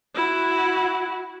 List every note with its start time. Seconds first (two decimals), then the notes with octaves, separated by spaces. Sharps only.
0.15 E4 F#4